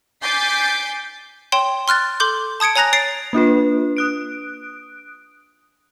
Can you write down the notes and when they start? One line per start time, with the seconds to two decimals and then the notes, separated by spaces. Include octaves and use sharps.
0.23 G#5 D6 G6 A6 B6 C7
1.52 C#5 G5 C6 E7 G7
1.88 C6 F6 F#6 A6
2.20 A4 C6 D6 G6
2.60 A5 D#6 G#6 C#7 D7
2.76 C#5 G#5 A#5 F#6 A#6 F7
2.93 C#5 A6 C7 D7
3.33 A#3 D4 F4 B4
3.97 D#6 F#6 D7